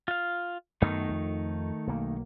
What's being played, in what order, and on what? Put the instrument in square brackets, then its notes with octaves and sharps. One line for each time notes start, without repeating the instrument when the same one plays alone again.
[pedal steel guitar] F4 F5
[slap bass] F#2 B3 [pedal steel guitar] D#3 A3 D#4
[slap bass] F2
B1 A#3